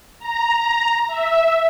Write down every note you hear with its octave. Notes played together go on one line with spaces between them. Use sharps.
A#5
E5